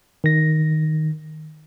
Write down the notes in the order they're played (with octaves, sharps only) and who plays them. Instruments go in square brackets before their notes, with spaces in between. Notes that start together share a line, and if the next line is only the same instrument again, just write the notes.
[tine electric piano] D#3 A#6